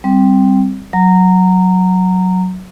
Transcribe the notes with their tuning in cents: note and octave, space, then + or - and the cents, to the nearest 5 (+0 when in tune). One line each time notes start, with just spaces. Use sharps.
G3 +0 C4 +0
F#3 +0 A#5 -15